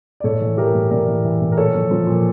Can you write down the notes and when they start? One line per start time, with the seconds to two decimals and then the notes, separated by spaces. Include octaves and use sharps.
0.20 D5
0.24 A2 A4 C#5
0.41 E3
0.57 E3 G4 A#4
0.75 A2
0.91 A2 A#4 D5
1.07 E3
1.24 E3
1.41 A2
1.52 A#4
1.57 A#2 A4 C#5
1.75 F3
1.91 F3
2.07 A#2